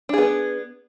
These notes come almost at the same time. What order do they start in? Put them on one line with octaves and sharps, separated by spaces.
D4 G#4 B3